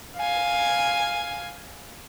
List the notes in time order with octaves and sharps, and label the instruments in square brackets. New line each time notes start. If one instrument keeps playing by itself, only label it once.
[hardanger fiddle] F5 G#5